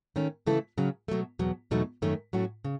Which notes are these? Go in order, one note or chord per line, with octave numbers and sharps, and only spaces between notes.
D#3 A3 C#4
C#3 E3 A3 E4 A4
C#3 F#3 C#4
B2 F#3 A3
E2 B2 F#3
E2 B2 F#3 A3 D#4
F#2 D#3 A3 C#4
A2 F#3 A3 C#4 F#4
C#3